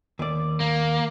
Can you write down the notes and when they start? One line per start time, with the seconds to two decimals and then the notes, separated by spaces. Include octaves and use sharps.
0.19 D#2 D5
0.60 A#3